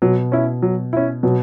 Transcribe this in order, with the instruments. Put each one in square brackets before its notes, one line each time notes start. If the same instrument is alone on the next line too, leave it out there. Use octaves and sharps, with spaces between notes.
[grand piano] B2 [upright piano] F#3
[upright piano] C#4 E4
F#3
C#4 E4
[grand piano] B2 [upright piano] F#3